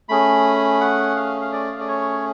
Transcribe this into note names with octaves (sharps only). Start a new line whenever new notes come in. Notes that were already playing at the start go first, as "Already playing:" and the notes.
A3 C#4 G#4 B5
F#5
F5
F5
D5
F5
D5
C#5